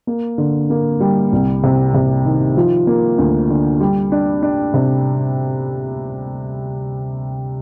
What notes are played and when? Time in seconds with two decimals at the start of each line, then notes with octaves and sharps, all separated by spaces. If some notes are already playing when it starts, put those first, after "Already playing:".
0.07 A#3
0.38 D3
0.70 A#3
1.00 G3
1.32 C2
1.63 C3
1.94 C3
2.25 D#3
2.57 F3
2.87 A#3
3.18 D2
3.49 D3
3.80 G3
4.12 D4
4.43 D4
4.74 C3